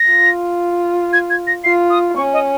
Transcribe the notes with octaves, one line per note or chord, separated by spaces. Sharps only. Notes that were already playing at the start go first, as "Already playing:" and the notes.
Already playing: A#6
F4
G#6
G#6
A#6
F4 C7
D#6
C#4 C#6
D#5